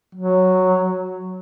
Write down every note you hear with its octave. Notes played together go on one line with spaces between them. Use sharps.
F#3